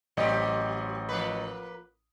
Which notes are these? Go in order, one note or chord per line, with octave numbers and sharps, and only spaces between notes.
A1 F#3 C4 G4 D#5
F3 A#3 B4